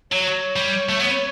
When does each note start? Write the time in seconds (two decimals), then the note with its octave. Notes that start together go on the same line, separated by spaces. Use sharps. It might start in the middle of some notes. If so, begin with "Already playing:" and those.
0.12 F#3 C#5
0.56 G3
0.89 A3
1.00 B3